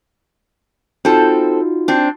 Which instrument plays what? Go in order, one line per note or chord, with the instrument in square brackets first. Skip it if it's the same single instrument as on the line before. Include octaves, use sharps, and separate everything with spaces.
[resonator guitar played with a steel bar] C4 A4 [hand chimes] D#4 F4 F#4
[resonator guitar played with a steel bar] C4 D4